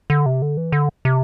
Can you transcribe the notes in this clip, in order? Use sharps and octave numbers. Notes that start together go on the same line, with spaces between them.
D3
C3
D3
E3
D3
C3